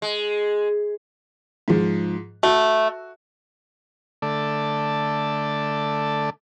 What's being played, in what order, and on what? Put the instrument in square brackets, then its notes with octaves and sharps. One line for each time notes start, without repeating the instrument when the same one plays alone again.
[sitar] G#3
[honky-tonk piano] G#2 F3
[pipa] A3 [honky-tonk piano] F#4
[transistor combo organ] D3 A3 D5 A5